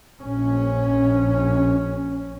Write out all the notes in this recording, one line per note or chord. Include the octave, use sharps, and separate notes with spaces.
A#1 C#4